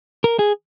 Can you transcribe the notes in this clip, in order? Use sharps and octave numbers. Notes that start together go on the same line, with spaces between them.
A#4
G#4